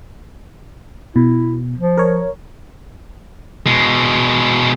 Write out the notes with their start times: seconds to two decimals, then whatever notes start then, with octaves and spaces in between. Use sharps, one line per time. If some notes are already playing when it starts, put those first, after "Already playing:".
1.16 B2 E4
1.77 F3
1.98 A#4 C#5
3.66 B2 G#3